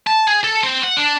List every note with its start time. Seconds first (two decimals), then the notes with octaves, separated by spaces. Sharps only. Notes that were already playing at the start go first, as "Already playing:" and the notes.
0.07 A5
0.27 G#4
0.44 A4
0.64 C4
0.84 F#5
0.97 D4